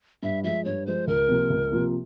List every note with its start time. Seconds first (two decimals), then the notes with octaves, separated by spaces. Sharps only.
0.23 G2 E5
0.44 F3 G#3 E5
0.65 G2 C#5
0.86 F3 G#3 C5
1.07 C#2 A#4
1.28 C3 F3 A#3 F4
1.50 C#2
1.72 C3 F3 A#3 F4